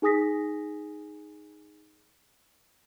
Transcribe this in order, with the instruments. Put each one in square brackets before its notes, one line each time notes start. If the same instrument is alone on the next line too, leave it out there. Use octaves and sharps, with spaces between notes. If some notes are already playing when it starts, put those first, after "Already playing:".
[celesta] D#4 G#4 G#5 D#6 A#6 B6